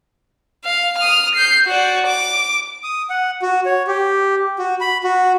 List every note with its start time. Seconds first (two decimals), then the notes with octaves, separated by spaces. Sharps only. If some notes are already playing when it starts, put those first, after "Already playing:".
0.65 F5
0.98 D#6 F6
1.35 G6 C7
1.66 F#4 D5
2.06 D6
2.84 D#6
3.10 F#5
3.42 F#4
3.66 C#5
3.87 G4
4.59 F#4
4.81 B5
5.04 F#4